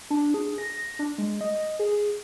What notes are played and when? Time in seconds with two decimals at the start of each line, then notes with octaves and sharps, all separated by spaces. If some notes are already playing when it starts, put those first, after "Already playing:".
0.10 D4
0.34 G#4
0.58 A#6
0.99 D4
1.18 G#3
1.41 D#5
1.79 G#4